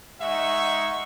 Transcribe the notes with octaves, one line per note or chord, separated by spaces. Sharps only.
G#3 D#4 E5 F#5 C#6